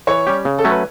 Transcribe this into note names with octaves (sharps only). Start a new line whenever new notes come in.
E3 C#5
G3 C#4 G4
C#3
A4
F#3 A3 C#4
B4